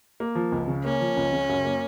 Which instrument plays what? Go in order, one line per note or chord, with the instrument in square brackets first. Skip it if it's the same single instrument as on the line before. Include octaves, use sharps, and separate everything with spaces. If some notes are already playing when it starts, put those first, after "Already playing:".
[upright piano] A#3
F3
C#2
C#3
[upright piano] A#3 [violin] C#4
[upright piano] F3
C#2
C#3
F#2
A#3